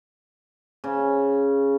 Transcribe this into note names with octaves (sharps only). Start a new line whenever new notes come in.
C#3